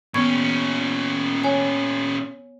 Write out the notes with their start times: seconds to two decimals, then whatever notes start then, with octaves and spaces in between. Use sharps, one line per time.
0.14 A#2 B3 C#4 C#6 G#6
1.44 C#5 G#5